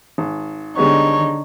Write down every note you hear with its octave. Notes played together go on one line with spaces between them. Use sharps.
G#1
D3 G3 G#3 B3 D#4 C#5